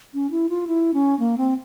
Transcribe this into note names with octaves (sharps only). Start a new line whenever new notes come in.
C#4
E4
F4
E4
C#4
A#3
C4